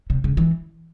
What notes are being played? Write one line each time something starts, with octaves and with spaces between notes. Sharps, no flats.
C3
C#3
E3